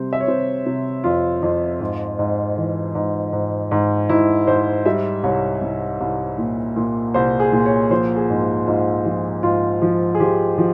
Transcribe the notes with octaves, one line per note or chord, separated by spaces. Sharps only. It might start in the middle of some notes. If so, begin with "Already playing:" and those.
Already playing: C3 G3 C5
E5
C#5
C3 C5
C3
F2 F4
F2
G#2
G#2
E3
G#2
G#2
G#2
G#2 E4
G#2 C5
G3 E5
C2 C#5
C2
C2
A#2
A#2
C2 C5
G#4
A#2
C#5
F3 C5
G#4
G#2
F4
G#2 F4
F3
G#2 F4
F3
G#4
F3 G4
F3